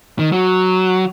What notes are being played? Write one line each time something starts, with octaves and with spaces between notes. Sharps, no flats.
D#3
F#3